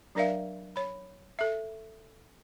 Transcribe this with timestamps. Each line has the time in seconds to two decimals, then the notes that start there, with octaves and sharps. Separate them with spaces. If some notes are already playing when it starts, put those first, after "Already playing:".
0.15 F#3 D4 A#4 D5 E5 F5
0.76 C#5 B5
1.39 A4 E5